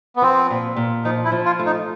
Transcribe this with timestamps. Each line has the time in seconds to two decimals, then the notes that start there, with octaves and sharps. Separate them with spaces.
0.16 B3
0.22 F3 C4
0.50 A#2
0.76 A#2
1.05 F3 D#4
1.25 E4
1.32 F3
1.45 F4
1.59 A3
1.66 D#4